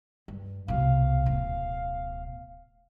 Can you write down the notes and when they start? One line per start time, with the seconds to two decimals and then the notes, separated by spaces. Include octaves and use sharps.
0.28 G2
0.68 C2 B2 F5
1.26 D1 B2